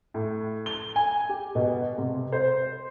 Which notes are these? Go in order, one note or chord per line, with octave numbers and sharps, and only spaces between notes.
A2
G7
G#5
G4
B2
C3
C5